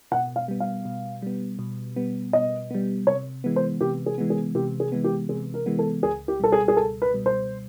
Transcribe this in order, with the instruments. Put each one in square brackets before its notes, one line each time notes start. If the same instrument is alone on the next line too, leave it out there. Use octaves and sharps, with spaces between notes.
[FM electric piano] B2 [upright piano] F#5
[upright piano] F5
[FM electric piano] G3 B3
[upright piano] F5
[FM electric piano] B2
G3 B3
B2
G3 B3
[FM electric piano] B2 [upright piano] D#5
[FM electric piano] G3 B3
[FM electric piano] C3 [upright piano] C#5
[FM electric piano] E3 G#3 B3
[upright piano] C5
[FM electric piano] C3 [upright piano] G4
[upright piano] G#4
[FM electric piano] E3 G#3 B3
[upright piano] G#4
[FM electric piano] C3 [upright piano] G4
[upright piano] G#4
[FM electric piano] E3 G#3 B3
[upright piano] G4
[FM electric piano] C3 [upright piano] G#4
[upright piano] A#4
[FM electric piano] E3 G#3 B3
[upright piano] A4
[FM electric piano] C#2 [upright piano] G#4
[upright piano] G4
[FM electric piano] B2 G3 [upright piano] A4
[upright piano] G#4
G#4
[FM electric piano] C#2 [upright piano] A4
[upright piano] B4
[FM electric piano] B2 G3
[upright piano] C5